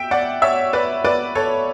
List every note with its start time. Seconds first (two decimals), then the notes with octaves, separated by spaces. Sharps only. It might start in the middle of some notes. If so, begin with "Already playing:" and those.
Already playing: E5 G5
0.11 D5 F#5
0.42 C#5 E5
0.73 B4 D5
1.04 B4 D5
1.35 A4 C#5